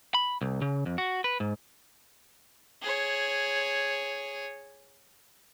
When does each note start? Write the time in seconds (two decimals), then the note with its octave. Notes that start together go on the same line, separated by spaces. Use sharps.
0.15 B5
0.41 C2
0.62 C#3
0.86 F2
0.98 F#4
1.24 B4
1.40 G#2
2.82 G#4 C#5